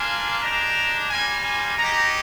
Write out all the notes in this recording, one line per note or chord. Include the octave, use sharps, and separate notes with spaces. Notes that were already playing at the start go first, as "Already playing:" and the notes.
Already playing: A#3 D4 F4 G#5
G#3 D4 G4 A#5
G3 A#3 F4 G#5
G#5
G#3 D#4 G4 A#5